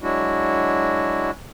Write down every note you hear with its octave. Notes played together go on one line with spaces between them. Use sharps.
F#3 G#3 D4 E4 F#4